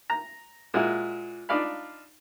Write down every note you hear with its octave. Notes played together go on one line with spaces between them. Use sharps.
A#5
A#2 G#3 E4 F#4
D4 D#4 F4 D5 F5 B5